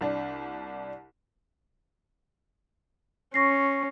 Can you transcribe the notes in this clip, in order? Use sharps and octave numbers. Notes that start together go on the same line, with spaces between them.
C2 D4
C#4 C#6 A#6 C7